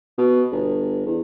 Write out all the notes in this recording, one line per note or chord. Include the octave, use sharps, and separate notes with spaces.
B2
G1
E2